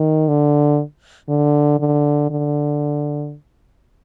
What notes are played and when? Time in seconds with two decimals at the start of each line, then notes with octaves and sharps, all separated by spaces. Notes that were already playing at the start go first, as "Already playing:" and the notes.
Already playing: D#3
0.28 D3
1.29 D3
1.80 D3
2.30 D3